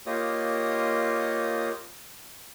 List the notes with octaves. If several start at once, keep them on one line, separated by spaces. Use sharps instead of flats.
A#3 F4 G4 C#5 D#5 D#6